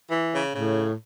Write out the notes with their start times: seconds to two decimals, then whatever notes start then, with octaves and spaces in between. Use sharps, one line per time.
0.10 E3
0.32 C#3
0.54 A2 C#3